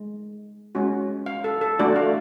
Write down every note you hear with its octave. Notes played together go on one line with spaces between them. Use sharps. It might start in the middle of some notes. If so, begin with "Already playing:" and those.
Already playing: G#3
G#3 C#4 F#4
F5
A4
A4
A3 D4 F#4 D5
F5